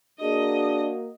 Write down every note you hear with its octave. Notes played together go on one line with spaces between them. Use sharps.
A#3 D4 F#4 G#4 D#5